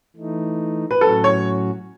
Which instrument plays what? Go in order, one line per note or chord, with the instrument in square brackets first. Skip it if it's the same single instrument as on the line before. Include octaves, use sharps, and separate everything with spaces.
[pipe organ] E3 A3 D#4
[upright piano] B4
[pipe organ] A2 F#3 C#4 F#4 [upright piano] A4
[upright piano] C#5